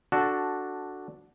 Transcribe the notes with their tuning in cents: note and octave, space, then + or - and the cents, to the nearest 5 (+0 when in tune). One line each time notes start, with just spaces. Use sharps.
D4 +0 F#4 +0 A4 +0